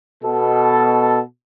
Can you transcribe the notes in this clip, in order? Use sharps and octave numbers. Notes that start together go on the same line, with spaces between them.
B2 A4